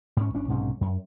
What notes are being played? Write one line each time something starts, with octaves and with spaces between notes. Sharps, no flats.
G#2 C#4
G1 C#4 D4
B1 G#2 C3 C#4
F#2